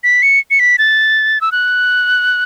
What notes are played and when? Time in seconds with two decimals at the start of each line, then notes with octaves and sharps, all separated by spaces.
0.04 B6
0.23 C#7
0.51 C#7
0.60 B6
0.78 A6
1.41 E6
1.52 F#6